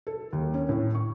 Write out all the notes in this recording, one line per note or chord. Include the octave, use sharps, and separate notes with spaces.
A4
D#2
C#4
A2
C#6